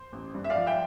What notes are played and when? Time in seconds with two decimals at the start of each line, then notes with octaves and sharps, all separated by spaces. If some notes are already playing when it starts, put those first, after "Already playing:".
Already playing: C5
0.13 A1
0.34 G2
0.44 E5
0.50 D5 F5
0.56 F3
0.67 E5 G5